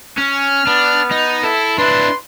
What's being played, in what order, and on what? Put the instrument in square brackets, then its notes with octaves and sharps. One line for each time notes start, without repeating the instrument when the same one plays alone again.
[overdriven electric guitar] C#4 [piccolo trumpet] F6
[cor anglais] B3 [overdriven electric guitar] D4
[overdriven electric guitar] D#4
[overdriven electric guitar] E4 [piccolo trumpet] A4
[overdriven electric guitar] D4 E4 [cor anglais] B4 [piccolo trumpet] C6